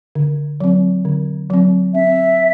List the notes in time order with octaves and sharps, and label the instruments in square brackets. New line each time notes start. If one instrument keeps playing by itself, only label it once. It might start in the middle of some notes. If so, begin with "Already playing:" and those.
[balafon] D3
F#3 C4
D3
F#3 C4
[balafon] C4 [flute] E5